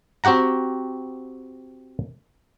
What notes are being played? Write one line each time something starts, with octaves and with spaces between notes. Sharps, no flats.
C4 F#4 G4 F#5 A#5